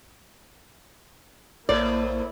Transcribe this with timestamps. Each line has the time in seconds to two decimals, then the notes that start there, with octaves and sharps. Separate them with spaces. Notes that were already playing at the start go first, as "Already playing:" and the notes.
1.69 A#1 A2 A#3 E4 C5 D5